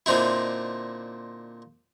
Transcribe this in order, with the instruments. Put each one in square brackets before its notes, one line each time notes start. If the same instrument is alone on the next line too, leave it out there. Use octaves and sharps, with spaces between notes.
[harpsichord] A#2 D3 C4 D#4 E4